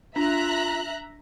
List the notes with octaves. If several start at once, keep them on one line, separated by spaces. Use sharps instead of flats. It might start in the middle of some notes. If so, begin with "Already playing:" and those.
D4 F4 E5 A#5 F#6